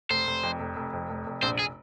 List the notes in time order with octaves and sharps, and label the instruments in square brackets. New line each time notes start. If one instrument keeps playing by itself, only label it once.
[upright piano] F1 [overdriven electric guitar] C5
[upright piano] F1
F2
F1
F1
F2
F1
F1
[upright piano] A#1 [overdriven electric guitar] C5
[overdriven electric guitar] G#4